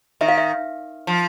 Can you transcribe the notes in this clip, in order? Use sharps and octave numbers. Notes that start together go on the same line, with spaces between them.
D#3 E5
F5
E5
F3